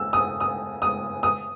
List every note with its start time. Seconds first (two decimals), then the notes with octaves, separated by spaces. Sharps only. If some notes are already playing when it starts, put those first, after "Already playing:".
Already playing: E6
0.13 D#6
0.40 D#6
0.82 D#6
1.23 D#6